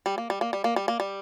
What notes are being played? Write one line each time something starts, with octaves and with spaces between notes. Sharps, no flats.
G3
A#3
G3
A#3
G3
A#3
G3
A#3
G3